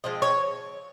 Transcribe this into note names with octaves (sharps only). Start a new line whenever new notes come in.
F3 G#3 C4 D#5
C#5